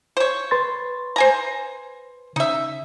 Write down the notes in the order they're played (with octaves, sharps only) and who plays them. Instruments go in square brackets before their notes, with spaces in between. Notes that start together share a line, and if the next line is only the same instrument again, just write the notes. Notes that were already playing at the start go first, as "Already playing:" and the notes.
[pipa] C5 C#5
[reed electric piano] B4 C6 A6
[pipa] C5 G#5 A#5
[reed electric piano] C#3 [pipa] D#4 E5